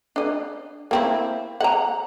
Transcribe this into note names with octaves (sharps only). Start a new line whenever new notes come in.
D4 D#5
A#3 C4 E4
F#5 A#5